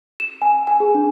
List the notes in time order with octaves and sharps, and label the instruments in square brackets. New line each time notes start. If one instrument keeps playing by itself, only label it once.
[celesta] E7
G#5
G#5
G#4
D4